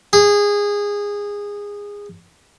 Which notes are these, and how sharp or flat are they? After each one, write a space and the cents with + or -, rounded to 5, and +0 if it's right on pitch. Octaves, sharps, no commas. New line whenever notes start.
G#4 -20